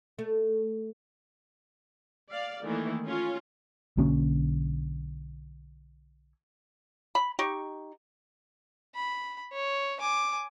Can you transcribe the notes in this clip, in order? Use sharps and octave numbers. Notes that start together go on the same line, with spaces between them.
A3
D5 F5
D#3 E3 A3 A#3 E4
C#4 F4
B1 D3 A#3 C#4
B5
D#4 G4 C#6
B5
C#5
G#5 D6